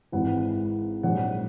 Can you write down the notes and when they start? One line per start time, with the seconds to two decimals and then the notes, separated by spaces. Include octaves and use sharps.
0.12 G#1 G#2 E3 F#5
1.03 A#1 G#2 F#3 F#5